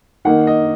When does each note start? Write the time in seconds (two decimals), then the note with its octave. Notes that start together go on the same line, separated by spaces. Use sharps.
0.25 D#3 A#3 D#4 F#5
0.47 D#5